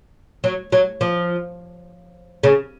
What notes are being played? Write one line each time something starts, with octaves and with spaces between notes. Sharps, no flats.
F#3
F#3
F3
C#3